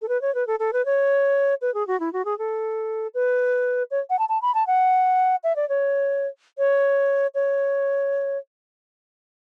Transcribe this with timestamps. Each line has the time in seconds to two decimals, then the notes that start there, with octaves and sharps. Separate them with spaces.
0.02 A4
0.08 B4
0.22 C#5
0.35 B4
0.47 A4
0.59 A4
0.73 B4
0.86 C#5
1.61 B4
1.74 G#4
1.87 F#4
2.00 E4
2.13 F#4
2.25 G#4
2.39 A4
3.14 B4
3.91 C#5
4.10 F#5
4.19 A5
4.29 A5
4.42 B5
4.55 A5
4.67 F#5
5.44 E5
5.56 D5
5.69 C#5
6.58 C#5
7.35 C#5